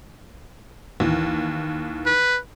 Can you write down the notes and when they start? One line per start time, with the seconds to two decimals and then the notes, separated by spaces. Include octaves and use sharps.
1.00 D#2 E3
2.06 B4